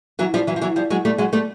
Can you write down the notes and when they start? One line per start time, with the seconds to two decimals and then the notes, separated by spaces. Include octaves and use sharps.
0.19 E3 F#3
0.34 F3 G3
0.47 E3 F#3
0.56 F3
0.61 E3 F#3
0.76 F3 G3
0.90 F#3 G#3
1.05 G3 A3
1.18 F#3 G#3
1.33 G3 A3